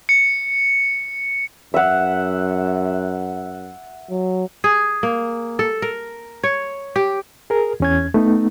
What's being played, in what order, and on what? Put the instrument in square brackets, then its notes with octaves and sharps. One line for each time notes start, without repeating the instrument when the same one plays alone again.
[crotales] C#7
[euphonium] F#2 [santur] E5 F#5
[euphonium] F#3
[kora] G#4
A#3
A4
A#4
C#5
G4
[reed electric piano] G#4 A#4
E2 C#4 G#6
A3 B3 D#4